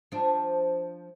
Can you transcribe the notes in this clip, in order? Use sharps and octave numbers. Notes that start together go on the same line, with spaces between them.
F3 D4